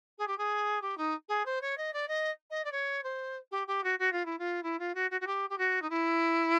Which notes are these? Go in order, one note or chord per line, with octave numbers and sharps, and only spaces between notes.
G#4
G4
G#4
G4
D#4
G#4
C5
C#5
D#5
D5
D#5
D#5
D5
C#5
C5
G4
G4
F#4
F#4
F4
E4
F4
E4
F4
F#4
F#4
F#4
G4
G4
F#4
D#4
E4